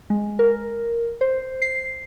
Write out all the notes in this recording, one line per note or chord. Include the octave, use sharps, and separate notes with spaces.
G#3
A#4
C5
C7